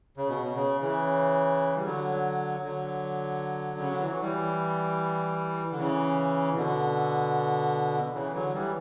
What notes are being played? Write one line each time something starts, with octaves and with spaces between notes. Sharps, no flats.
C#3
B2
B2
C#3
C#3 E3
G3
D3 F#3
D3 F#3
C#3
D3
E3
F#3
E3 G3
D3
C#3 E3
B2 D3
C#3 E3
D3 F#3
E3 G3